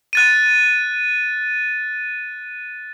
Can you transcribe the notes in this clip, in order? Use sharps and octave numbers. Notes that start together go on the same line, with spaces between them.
F#6 A6 D#7